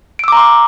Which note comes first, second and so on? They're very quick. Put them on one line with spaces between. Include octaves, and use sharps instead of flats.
D7 E6 D6 A#5 C6